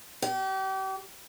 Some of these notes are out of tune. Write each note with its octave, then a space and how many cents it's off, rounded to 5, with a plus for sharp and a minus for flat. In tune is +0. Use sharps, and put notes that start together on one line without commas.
G4 -35